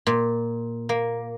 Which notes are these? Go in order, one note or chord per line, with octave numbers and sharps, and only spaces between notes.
A#2
A#3